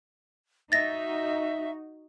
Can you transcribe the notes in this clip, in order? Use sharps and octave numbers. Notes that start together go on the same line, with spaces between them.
D#4 F#4 E5 A6 A#6